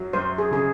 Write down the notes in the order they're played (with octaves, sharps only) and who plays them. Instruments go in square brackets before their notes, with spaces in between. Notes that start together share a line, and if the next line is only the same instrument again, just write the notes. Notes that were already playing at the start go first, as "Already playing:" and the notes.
Already playing: [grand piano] F#2 F#3
[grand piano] F#2 [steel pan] C5
[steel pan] G#4
[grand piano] C#3 [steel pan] G#4